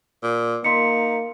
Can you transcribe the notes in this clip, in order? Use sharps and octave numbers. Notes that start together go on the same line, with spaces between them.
A#2
A#3 D#4 C6 B6 C#7